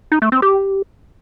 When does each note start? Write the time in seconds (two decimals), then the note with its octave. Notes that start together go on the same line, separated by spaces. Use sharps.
0.12 D#4
0.22 A3
0.32 C4
0.42 G4